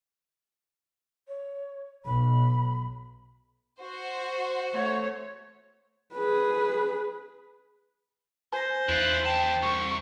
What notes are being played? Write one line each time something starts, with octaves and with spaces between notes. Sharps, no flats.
C#5
B1 B5
F#4 C5
A3 C#5
G#4 B4
C5 G#5 A#6
E2 E4 F4 F#6
D#2 G5 A5
C2 C#6